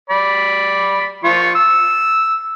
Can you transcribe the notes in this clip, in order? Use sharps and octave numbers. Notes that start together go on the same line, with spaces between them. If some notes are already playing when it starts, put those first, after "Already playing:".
D5 B5
F3 F4 C#6
E6